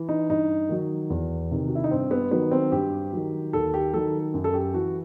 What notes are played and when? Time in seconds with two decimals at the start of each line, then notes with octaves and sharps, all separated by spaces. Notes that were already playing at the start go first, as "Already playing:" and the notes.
Already playing: E3
0.09 D#4
0.29 G2 D#4
0.69 D#3 F#3
1.10 E2
1.51 C3 D#3
1.68 F#4
1.75 E4
1.84 D#4
1.91 G2 C4
2.11 B3
2.31 D#3 F#3 B3
2.51 C4
2.72 G2 G4
3.13 D#3 F#3
3.53 D#2 A4
3.74 G4
3.94 D#3 F#3 A4
4.34 F#2
4.44 A4
4.54 G4
4.74 E3 F#4